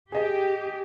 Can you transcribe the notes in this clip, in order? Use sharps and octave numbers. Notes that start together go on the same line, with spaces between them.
G4 G#4 D#5